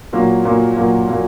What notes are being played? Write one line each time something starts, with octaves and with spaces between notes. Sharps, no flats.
A#2 F#3 A#3
A#2 F#3 A#3
A#2 F#3 A#3
A#2 F#3 A#3